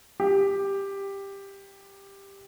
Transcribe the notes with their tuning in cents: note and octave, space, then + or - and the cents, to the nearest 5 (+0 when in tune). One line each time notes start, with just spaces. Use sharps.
G4 +10